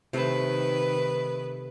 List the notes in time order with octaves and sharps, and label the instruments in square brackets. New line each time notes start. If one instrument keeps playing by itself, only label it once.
[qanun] C3 A3 [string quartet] D#3 B4